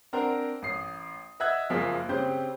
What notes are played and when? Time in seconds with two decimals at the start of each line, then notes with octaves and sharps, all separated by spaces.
0.13 C4 D4 A#4 C5 F#5 A#5
0.62 A1 D#6 C7
1.40 D#5 E5 F#5 E6 F#6 G#6
1.70 F#1 F3 A#3 G#4 B6
2.09 C#3 C4 G4 C5 G6